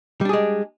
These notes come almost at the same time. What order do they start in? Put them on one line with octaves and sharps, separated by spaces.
G3 D4 G#4 G#3